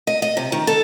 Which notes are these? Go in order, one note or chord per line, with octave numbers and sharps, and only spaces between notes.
D#5
D#5
C3
D#3
A4